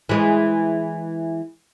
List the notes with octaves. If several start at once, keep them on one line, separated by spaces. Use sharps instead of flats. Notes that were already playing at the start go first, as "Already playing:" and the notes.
E3 G#3